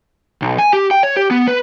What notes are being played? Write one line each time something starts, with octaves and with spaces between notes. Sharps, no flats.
B1
G#5
G4
G5
C#5
G4
B3
B4